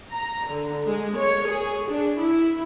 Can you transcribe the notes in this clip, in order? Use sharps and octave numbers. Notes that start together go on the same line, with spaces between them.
A#5
D3
G#3
C#5
G#4
D4
E4